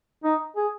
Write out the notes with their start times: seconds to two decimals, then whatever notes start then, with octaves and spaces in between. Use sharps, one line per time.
0.24 D#4
0.56 G#4